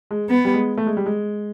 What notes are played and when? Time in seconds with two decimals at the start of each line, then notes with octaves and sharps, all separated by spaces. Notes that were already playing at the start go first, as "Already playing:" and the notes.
0.11 G#3
0.29 B3
0.45 G3
0.54 G#3
0.78 A3
0.87 G#3
0.97 G3
1.06 G#3